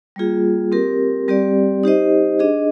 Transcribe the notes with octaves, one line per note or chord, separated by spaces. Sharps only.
G3 A#3 F4 G#4
C4 G4 A#4
G3 C4 G4 D5
D#4 G4 C5 D#5
D4 G#4 D#5